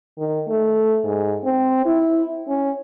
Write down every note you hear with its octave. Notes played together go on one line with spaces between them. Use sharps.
D#3
A3
G#2
C4
E4
C#4